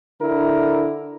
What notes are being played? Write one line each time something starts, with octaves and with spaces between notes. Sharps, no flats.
D3 E4 A#4